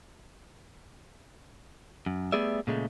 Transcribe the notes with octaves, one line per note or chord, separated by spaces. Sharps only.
F#2
G3 A3 B3 G#4 D5 E5
A#2 C#3 G#3 A3